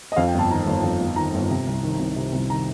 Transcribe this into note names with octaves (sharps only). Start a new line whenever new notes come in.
D#5
F2 F5
G5
G1 A5
D#3 A#5
G1
F2
G1
D#3 A#5
G1
C3
C2
D#3
C2
C3
C2
D#3 A#5